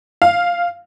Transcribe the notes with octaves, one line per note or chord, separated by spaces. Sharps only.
F5